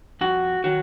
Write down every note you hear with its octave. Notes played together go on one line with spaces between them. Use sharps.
F2 F#4
D#3 F#3 F#4